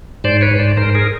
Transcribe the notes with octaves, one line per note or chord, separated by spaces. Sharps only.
G#2 C5 D5
B4 C#5
G#2
C5 D5
G#2 A#4 C5
G#4 A#4